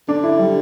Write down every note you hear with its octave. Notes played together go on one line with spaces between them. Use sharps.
D3 D4
E4
G3